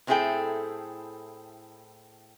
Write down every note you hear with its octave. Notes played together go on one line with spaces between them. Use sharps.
A2 C4 E4 G#4 A4 G5